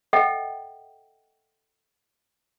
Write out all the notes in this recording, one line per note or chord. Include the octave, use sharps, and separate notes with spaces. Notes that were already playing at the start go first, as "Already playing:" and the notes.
A4 D#5 E5 F#5 G5